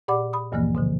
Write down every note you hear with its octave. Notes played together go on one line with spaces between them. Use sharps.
A#2 G4 D5 F#5 B5 D6
B5 D#6
D2 G2 A#2 E3 F3 A#3
B2 D3 F3